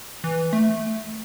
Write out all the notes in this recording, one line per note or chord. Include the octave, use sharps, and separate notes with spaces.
E3
A3